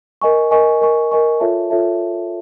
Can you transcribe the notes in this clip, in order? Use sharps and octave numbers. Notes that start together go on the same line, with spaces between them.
A#4 D#5 G#5 C#6
A#4 D#5 G#5 C#6
A#4 D#5 G#5 C#6
A#4 D#5 G#5 C#6
F4 A4 C#5 E5 A5
F4 A4 C#5 E5 A5